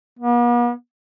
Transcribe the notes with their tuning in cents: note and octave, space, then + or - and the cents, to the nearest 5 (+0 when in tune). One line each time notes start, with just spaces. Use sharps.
B3 -45